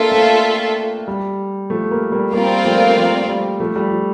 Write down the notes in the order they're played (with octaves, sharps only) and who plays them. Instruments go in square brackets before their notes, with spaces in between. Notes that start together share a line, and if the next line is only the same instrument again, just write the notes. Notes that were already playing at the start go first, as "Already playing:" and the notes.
Already playing: [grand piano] A#3 D4 [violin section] F4 A4 E5
[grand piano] A3 C4
G3
F3 A3
G3 A#3
G3 A#3
[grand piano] G3 A#3 [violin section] C4 F4 A#4 D5 F5
[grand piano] F3 A3
F3
G3
F3 A3
G3
F3